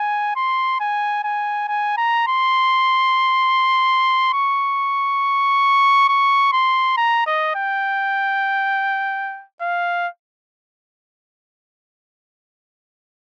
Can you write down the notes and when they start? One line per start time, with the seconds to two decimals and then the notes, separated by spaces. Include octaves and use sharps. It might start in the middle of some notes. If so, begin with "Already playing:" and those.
Already playing: G#5
0.36 C6
0.81 G#5
1.24 G#5
1.68 G#5
1.98 A#5
2.28 C6
4.33 C#6
6.09 C#6
6.53 C6
6.97 A#5
7.27 D#5
7.56 G5
9.62 F5